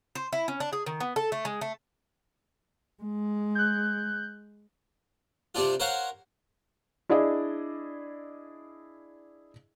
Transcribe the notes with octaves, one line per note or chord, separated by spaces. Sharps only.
C5
E4
C#4
D4
G#4
D#3
B3
A4
A3
G#3
A3
G#3
F#6 G6
C3 G3 C4 D4 F4
A#4 C5 C#5 F5 F#5
D4 E4 G#4 D5 D#5